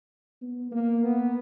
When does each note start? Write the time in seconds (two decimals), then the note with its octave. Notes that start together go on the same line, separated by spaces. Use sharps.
0.41 B3
0.71 A#3
1.03 B3